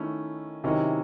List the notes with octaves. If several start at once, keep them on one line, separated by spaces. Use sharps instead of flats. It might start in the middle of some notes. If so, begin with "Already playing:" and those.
Already playing: D#3 A3 C#4 E4
C3 D#3 F#3 C#4 E4